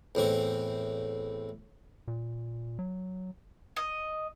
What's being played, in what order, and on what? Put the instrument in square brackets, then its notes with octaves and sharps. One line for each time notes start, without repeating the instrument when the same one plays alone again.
[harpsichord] E2 A2 C4 C#6
[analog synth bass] A#2
F#3
[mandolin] D#5